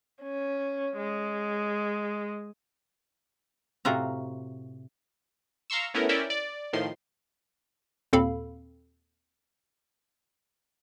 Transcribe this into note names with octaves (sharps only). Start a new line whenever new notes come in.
C#4
G#3
A2 C3 F4 F#4 A#5
F5 A#5 C6 C#6 E6
A3 B3 C#4 E4 A#4
C#4 E4 A#4 D5 E5 G5
D5
A2 D#3 F3 C6
D#2 A#2 C4 A4 F5 B5